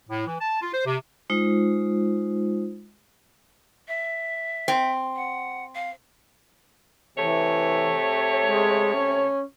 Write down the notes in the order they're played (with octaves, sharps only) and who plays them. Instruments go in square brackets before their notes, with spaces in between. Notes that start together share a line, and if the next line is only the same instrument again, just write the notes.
[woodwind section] A2
E3
A5
F4
C5
C3
[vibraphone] G#3 D#4 F4 C5
[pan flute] E5
[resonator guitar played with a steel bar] C4
[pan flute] F#5
F5
[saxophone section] C3 A3 C#5 [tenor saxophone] E3
[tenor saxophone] G#3
C#4